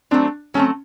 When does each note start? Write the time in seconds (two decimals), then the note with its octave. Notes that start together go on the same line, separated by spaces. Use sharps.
0.11 F#3 A3 C4 D4
0.54 F#3 A3 C4 C#4